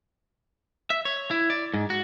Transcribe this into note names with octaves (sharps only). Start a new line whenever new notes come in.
E5
C#5
E4
D5
G#2
F#4